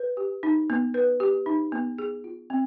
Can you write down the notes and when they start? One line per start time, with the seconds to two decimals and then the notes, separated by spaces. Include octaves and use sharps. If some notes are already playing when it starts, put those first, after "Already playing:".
Already playing: B4
0.17 G4
0.43 D#4
0.70 B3
0.94 B4
1.20 G4
1.46 D#4
1.72 B3
1.99 G#4
2.24 F4
2.50 C4